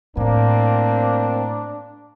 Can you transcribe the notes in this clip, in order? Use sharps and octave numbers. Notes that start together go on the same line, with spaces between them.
A2 A#3 C4 D4